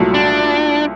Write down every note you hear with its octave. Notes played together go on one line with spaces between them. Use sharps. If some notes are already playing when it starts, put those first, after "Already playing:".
Already playing: C2 A#2 F#3 A3
D4